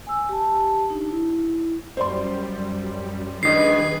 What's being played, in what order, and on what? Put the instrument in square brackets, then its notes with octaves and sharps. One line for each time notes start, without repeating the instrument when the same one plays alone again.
[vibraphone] G#5 E6
G4 A5
D4 D#4
E4
[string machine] F#2 G3 [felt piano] C5 D5 C6
[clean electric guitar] G2 D#3 D#5 [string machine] G#4 B4 G#5 [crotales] C7